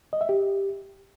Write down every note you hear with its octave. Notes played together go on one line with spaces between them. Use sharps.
D#5
E5
G4